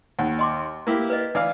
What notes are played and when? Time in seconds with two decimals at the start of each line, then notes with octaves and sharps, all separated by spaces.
0.19 D#2 F#5
0.39 D#5 C6 D6
0.87 A#3 E4 G4
1.10 B4 D#5
1.35 E3 D5 F5